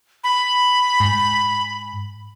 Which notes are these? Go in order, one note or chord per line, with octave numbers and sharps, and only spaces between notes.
B5
G#2